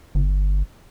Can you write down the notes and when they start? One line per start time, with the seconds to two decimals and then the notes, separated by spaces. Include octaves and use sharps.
0.15 G1